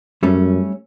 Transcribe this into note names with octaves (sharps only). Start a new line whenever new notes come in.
F#2 G3 A3 C#4